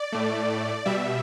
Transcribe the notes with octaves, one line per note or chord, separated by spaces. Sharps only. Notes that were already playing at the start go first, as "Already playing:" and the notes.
Already playing: D5
A2 A3
B2 G3 E5